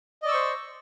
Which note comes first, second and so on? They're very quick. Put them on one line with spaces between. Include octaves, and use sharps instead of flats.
D#5 D5 E6 C#6 C5